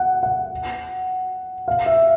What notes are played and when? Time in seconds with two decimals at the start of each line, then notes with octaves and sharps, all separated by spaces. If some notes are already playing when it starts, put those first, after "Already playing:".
Already playing: F#5
0.23 F#5
1.68 F5
1.86 E5